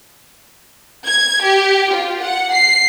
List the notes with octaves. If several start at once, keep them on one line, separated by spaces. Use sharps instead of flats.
G#6
G4
F4
F#5
C7